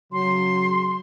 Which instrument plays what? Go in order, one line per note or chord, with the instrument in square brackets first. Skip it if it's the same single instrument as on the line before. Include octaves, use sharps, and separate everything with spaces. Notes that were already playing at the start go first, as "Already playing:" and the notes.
[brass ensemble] C#3 F#3 [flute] C6